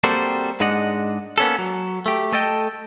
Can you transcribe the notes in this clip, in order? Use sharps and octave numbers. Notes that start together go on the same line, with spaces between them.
G3 A#3 C4 F#4 A4 C5
G#2 G#3 D4 D#5 F#5
A#3 B3 C#4 F4 A4
F#3
A3 G4
A3 A4 D#5 G5